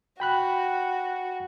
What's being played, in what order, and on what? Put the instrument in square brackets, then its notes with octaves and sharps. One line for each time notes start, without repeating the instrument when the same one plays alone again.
[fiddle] F#4 [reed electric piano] G5 B5 F#6